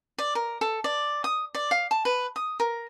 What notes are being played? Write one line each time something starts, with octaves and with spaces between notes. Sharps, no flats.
D5
A#4
A4
D5
D#6
D5
F5
A5
B4
D#6
A#4